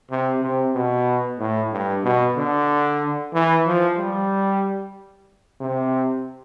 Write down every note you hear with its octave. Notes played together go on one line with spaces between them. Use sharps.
C3
C3
B2
A2
G2
B2
D3
E3
F3
G3
C3